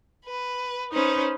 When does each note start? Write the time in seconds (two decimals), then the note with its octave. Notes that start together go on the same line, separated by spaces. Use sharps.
0.24 B4
0.92 C#4 D#4 B4 C5